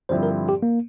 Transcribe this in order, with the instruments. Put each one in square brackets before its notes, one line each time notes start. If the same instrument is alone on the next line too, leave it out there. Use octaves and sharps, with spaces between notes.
[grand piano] G2 D3 F3 C4 E4 [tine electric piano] C5
[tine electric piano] A#4
G4
A#3